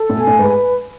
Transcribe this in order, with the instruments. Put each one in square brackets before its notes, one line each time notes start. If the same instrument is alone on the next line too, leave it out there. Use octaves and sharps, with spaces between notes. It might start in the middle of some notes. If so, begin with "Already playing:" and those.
Already playing: [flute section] A4
[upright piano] A2
[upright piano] B2 [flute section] G#5
[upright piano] A2
[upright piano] G#2 [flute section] B4